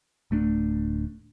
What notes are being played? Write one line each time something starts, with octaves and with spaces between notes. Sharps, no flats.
D1 A3 C#4 D4